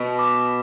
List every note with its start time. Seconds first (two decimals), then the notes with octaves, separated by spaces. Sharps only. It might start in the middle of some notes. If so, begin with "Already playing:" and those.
Already playing: B2
0.19 D6